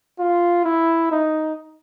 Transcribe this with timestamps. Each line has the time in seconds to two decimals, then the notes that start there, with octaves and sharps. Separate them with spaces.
0.19 F4
0.65 E4
1.11 D#4